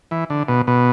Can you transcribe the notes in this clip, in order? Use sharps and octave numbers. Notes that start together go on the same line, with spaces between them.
E3
D3
B2
B2